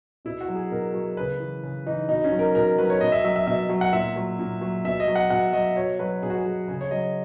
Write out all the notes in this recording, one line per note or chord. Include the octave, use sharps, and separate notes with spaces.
B2 E4
F#4
F#3
G#4
B2 A#4
F#3
C#3 B4
E3
C#3
E3 D#4
B2 D#4
C#4
F#3
A#4
B2 A#4
F#3 B4
C#5
B2 D#5
E5
F#3 E5
E5
B2 E5
F#3
F#5
A#2 E5
F#3
A#2
F#3
B2 E5
D#5
F#3
F#5
B2 F#5
F#3 D#5
B2 C#5
F#3 B4
B2 G#4
F#4
G#4
F#3
C#3 G#4
C#5
F#3 D#5